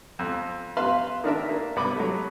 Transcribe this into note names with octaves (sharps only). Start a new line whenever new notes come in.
F2
B4 E5 F5 B5 C6
D#3 D4 A#4 E5
A#3
C2 B3 B5 D6
F#3 A3